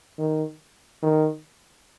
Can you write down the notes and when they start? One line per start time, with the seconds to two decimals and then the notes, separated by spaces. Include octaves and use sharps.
0.18 D#3
1.02 D#3